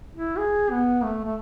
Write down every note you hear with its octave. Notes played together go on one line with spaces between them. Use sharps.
E4
G#4
B3
A3
A3